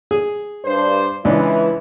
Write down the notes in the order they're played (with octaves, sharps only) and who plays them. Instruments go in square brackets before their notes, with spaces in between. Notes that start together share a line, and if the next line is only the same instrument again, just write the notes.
[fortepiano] G#4
[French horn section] G2 D4 C5
[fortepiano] C#2 D4 [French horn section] E3